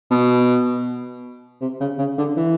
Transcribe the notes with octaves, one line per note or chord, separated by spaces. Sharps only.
B2
C3
C#3
C#3
D3
E3